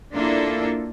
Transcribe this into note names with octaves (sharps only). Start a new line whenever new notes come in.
A#3 D4 E4 F4 A4